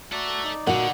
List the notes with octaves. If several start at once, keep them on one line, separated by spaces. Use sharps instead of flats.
F#4 A4 D5 E5 A#5
D#4 D5
A#2 D3 F#4 F#5